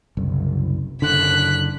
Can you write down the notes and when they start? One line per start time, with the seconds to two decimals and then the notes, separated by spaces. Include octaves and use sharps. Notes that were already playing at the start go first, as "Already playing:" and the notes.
0.17 F#1 C2
1.02 F#1 D3 F#6 B6